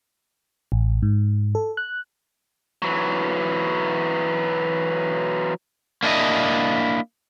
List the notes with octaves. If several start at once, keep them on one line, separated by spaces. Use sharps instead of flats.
A1
G#2
A4
F#6
E3 F#3
A#3 D4 E4 D#5